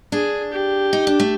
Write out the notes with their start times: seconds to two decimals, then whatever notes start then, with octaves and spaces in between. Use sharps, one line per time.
0.12 D4 G#4
0.52 G4
0.93 D#4
1.07 D4
1.20 A3